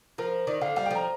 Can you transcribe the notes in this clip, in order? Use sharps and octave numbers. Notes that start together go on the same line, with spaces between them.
F3 A#4
D#3 D5
D3 F5
G3 F5
G5
F3 A#5